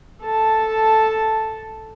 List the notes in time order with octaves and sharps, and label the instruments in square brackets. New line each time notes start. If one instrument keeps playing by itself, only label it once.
[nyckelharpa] A4 A5